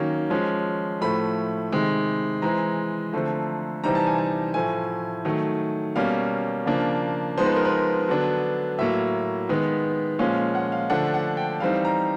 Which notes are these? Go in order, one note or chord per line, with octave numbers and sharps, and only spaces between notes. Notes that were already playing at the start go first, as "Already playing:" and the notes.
Already playing: D#3 F#3 A#3 C#4
F3 G#3 C#4
A2 F3 A3 B5
C3 D#3 G#3
E3 G#3 C4 A#5
D3 F3 A3 C4
C3 E3 G3 C4 D#4 A#5
A5
G#5
A5
A2 F3 A3 G#5
D#3 F#3 A3
B2 G3 A#3 C#4 F5
C#3 F3 A#3 D4
F3 G#3 B3 D#4 C5
B4
A#4
B4
D3 F#3 B3 D4
A2 F#3 A#3 E5
D#3 G#3 B3
A#2 F3 G#3 C#4 F5
F5
F#5
F5
D3 F3 A3 D4 F#5
F#5
G5
E3 G3 C4 D#4 F5
A#5